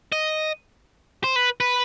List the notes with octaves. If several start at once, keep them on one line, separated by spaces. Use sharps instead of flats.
D#5
C5
B4
B4